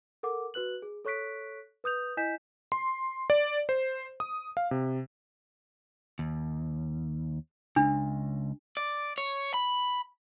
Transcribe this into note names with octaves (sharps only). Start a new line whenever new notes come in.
A4 A#4 F#5 D6
F#4 B4 F#6 F#7
G#4
A4 C#5 C#6 F#6 B6 D7
B4 D#6 G6 F7
E4 D#5 G#5 G6 B6 E7
C6
D5
C5
D#6
F5
C3
D#2
C#2 D4
D5
C#5
B5